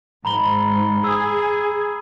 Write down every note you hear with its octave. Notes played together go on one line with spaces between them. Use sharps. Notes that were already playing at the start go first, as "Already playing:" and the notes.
G#2 A#5 B5 G7
G#4 D#6 E6